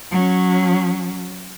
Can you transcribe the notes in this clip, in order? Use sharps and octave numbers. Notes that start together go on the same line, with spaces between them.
F#3 C#4